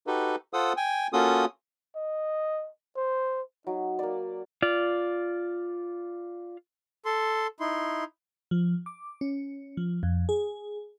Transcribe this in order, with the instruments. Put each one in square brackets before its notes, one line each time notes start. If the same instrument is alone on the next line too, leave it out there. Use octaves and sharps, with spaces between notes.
[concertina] D#4 F#4 G4 A4 B4
F4 A4 C5 F#5 D#6 E6
G5 G#5
A#3 C#4 F4 F#4 A4 D#6
[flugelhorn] D#5
C5
[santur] F#3 [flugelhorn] D#4
[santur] A#3 D5
[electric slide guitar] F4 D5
[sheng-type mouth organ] A4 C6
D#4 E4 C6
[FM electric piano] F3
D6
C#4
F3
F2
G#4